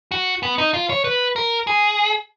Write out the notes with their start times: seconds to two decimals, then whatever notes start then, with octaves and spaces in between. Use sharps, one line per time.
0.11 F#4
0.43 B3
0.58 D#4
0.74 F4
0.90 C#5
1.04 B4
1.36 A#4
1.67 G#4